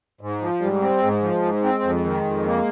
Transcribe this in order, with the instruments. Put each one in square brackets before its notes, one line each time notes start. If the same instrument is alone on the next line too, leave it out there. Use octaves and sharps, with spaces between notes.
[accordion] G#2
F3
[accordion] G#2 [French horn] G3
[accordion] C4
[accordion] G#2 [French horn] G#3
[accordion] F3
G#2
C4
F2
D#3
F2
A#3